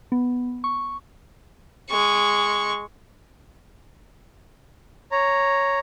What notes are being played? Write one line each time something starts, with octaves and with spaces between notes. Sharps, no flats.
B3
C#6
G#3 C#6
C#5 A#5